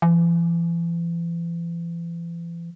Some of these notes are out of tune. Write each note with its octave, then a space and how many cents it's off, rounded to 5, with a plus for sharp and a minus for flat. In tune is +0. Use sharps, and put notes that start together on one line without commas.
E3 +40